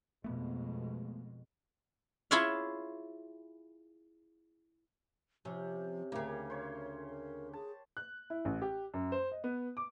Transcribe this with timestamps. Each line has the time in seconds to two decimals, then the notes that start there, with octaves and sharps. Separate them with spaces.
0.24 F2 B2 G#3 A3 B3
2.31 E4 F4 G#4 C#5 E5 F5
5.45 C3 F3 C#4
6.12 D2 C#3 A#3 G4 A#4
6.50 C5 C#5
7.09 A#4
7.53 G#4 A5
7.97 F#6
8.30 E4
8.45 A1
8.62 G4
8.94 F#2
9.12 C5
9.32 D#5
9.44 B3
9.77 D6